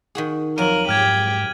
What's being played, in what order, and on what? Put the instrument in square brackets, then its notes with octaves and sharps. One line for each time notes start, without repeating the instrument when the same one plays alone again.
[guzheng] D#3 F#4 G#4
[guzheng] F2 F#3 [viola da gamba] A#4 [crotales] D#7 F#7
[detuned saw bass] G#2 [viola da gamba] G4 [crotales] F6 G#6